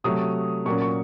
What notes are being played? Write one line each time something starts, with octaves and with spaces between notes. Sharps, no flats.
C3 F#3 A3 D#6
A#2 F#3 A#3 C#4 C#6
C#6